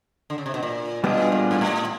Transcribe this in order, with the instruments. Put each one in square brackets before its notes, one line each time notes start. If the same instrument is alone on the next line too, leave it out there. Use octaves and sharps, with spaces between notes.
[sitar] D3
C#3
C3
B2
A#2
[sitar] B2 [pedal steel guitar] G3 B3 D4 F4 G#4
[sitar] A#2
G#2
A2